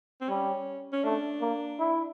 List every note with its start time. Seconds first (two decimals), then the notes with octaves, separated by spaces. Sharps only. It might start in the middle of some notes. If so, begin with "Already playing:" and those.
0.21 C4
0.29 G3 C#4
0.93 C#4
1.04 A3 D4
1.41 A#3
1.79 E4